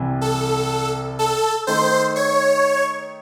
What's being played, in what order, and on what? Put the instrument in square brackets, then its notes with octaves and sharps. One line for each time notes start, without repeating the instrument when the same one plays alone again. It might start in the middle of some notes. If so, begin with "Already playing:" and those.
Already playing: [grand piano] C2 C3 E3
[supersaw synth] A4
A4
[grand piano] D#3 A3 D#4 [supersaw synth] C5
[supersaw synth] C#5